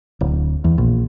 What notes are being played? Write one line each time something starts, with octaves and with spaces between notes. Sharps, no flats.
D1
E2
A#1